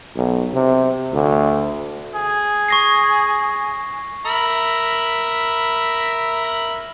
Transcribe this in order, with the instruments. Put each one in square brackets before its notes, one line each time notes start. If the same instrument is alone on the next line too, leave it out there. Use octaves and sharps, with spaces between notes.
[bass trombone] B1
C3
D2
[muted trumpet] G#4
[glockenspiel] C#6 A#6 C7
[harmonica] A#4 E5 B5